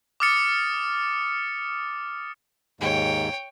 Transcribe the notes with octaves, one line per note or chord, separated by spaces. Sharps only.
D6 D#6 F6 A6 C#7
D#2 G#2 C#5 G5